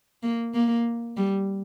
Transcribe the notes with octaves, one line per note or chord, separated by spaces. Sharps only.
A#3
A#3
G3